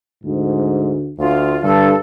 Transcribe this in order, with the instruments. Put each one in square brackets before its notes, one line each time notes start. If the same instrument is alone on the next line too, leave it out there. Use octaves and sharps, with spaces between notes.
[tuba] D2 [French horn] G#2
[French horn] D2 [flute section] F4
[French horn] G2 [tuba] D3 [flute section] A4